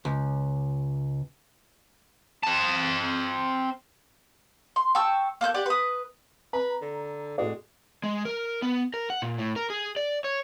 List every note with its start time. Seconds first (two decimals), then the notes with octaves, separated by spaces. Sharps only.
0.05 C#2
2.43 C4 A5
4.76 C6
4.95 G5 A5 C#6 E6
5.41 A#3 A4 F#6 G6
5.54 G4 D5 F#5
5.66 B4 D#6
6.53 B4 A#5
6.82 D3
7.38 A2 G#3 F#4 D5
8.03 G#3
8.25 A#4
8.62 B3
8.94 A#4
9.10 F#5
9.22 A#2
9.38 A2
9.56 A#4
9.70 G#4
9.96 D5
10.24 C#5